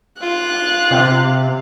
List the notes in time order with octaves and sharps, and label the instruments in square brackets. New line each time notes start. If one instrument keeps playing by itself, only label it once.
[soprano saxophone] F4 [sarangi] F5 [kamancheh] F#6
[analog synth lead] C3